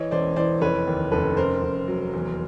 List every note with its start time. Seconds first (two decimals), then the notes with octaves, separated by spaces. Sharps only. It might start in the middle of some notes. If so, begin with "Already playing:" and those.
Already playing: E3 C#5 D#5
0.11 E1 C5 D5
0.36 E3 C5 D5
0.61 F1 B4 C#5
0.87 D#2
1.12 F1 A4 B4
1.37 C#3 A#4 C5
1.63 F1
1.88 F#3
2.14 E2